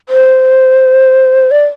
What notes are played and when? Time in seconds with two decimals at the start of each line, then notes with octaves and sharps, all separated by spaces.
0.09 C5
1.51 D5